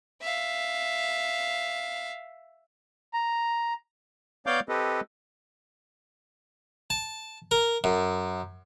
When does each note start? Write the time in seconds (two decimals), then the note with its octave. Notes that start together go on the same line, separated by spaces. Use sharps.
0.22 E5 F5
3.14 A#5
4.46 B3 C#5 D5 F5 D6 G6
4.69 C4 G4 A4 B4 D#5
6.90 A5
7.51 A#4
7.84 F#2